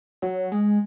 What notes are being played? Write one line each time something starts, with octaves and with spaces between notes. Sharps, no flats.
F#3
G#3